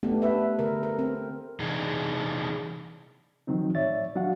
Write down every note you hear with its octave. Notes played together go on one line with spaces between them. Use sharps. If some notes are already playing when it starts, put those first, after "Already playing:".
A3 B3 D4 G4
D4 B4 E5
D3 A#4
A#4
C4
C3 E3 D4 D#4 G#4
D#3 F3 F#3 C4 D#4
A2 C#5 D5 E5 A6
F#3 D4 F#4 F5 F#5